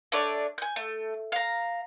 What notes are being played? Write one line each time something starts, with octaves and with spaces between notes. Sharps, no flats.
A3 D4 C#5 D5
G#5 G6
A3
F5 A#5